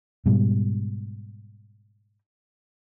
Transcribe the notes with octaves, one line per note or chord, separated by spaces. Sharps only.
G#2 B2 G3